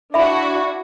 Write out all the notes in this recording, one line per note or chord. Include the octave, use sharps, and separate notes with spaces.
D4 E4 F#4 E5 B5